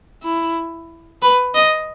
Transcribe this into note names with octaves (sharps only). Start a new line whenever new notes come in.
E4
B4
D#5